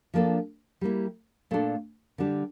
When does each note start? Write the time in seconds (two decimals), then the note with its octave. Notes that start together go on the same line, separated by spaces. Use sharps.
0.14 F3 A#3 D4 A4
0.81 G3 A#3 E4
1.51 A#2 A3 D4 A4
2.18 D3 G3 D4 G4